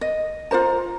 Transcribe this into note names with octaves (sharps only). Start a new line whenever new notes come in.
D#5
F4 A4 C5 A#5